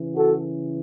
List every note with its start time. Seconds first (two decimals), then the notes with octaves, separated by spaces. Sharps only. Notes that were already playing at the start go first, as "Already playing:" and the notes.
Already playing: C#3 E3
0.15 F#4 A4